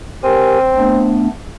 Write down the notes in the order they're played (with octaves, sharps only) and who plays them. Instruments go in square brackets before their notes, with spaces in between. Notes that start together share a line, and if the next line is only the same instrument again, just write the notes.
[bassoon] C4 [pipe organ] G4 A#4 G#5
[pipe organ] A3 B3 D4